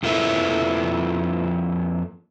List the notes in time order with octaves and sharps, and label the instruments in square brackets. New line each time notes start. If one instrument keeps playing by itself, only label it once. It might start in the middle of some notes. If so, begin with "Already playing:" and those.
[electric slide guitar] F2 F3 A#3 E4 A4 B4